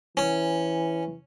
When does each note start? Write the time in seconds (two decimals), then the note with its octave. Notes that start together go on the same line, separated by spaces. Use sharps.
0.17 E3 C#4